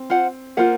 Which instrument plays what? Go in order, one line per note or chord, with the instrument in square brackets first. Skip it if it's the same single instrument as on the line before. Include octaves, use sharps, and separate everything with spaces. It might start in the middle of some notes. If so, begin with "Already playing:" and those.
Already playing: [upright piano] C4
[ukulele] F4 C5 F#5
[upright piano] A#3 [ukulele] F4 C5 F#5